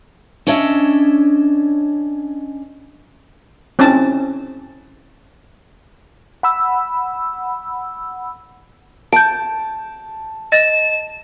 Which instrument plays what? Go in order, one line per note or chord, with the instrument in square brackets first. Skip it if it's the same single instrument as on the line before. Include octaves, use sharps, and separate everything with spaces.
[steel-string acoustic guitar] C#4 D4 C#5 D#5 E5
[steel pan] C4 C#4 D#4 E4 A5
[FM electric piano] F#5 B5 E6
[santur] A5 [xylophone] G6 D7
[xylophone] D#5 A6 [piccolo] E7